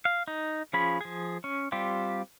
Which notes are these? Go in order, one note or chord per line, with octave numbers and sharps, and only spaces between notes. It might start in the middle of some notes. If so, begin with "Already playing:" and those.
F5
D#4
F3 C#4 F4 G#4 B5
F3 G#4
C#4
G3 C4 F4 G4